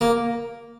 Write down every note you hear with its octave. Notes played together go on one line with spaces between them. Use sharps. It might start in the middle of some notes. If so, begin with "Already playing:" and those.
A#3